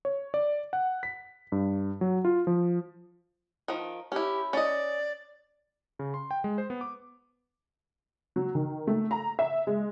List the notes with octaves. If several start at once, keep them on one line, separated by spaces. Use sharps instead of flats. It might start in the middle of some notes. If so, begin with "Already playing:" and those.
C#5
D5
F#5
B6
G2
F#3
F4
F3
D#3 F3
C#4 E4 G4
C#4 D5 D#5
C#3
C6
G5
G#3
C5
B3
D6
F#3
D#3
A3
A#5
E5
G#3